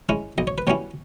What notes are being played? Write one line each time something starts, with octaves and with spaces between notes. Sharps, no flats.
G#3 C#4 E4
B1 D#5
C#5
B4
B2 G3 C#4 E4 C#5